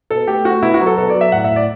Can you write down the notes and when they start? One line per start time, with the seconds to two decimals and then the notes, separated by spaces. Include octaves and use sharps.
0.10 B2 A4
0.27 A3 G4
0.45 A3 F#4
0.62 B2 E4
0.74 F#4
0.80 F#3
0.86 A4
0.98 B2 A4
1.10 D5
1.15 F#3
1.21 E5
1.32 A2 F#5
1.44 E5
1.50 A2
1.56 D5